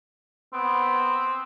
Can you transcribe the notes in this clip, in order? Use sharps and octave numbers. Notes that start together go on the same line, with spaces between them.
B3 C4